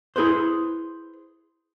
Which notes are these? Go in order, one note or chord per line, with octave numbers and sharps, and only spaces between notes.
E4 G#4 B4 C5